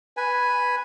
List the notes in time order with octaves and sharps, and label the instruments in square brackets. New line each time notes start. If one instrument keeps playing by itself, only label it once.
[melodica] B4 G#5